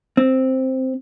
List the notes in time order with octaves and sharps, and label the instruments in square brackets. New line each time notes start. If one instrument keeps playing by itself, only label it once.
[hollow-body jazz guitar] C4